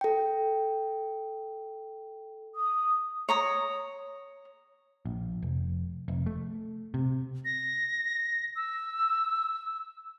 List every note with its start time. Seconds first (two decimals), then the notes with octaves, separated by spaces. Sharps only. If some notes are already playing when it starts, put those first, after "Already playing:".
0.01 A4 G5
2.55 D#6
3.29 C#5 A#5 D#6
5.06 A#1
5.42 F1
6.08 F1
6.26 A3
6.94 C3
7.45 A#6
8.56 E6